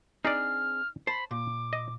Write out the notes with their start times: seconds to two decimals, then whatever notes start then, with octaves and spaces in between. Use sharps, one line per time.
0.25 C4 D4 D#4 G#4 D5 F6
1.07 C5 A5 B5
1.31 A#2 D6
1.73 D#5